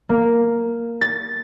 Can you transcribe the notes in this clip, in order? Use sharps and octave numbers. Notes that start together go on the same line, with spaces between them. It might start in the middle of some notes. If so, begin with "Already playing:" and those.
A#3
A6